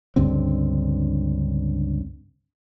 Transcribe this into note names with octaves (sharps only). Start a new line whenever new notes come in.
C#2 G2 D3 C4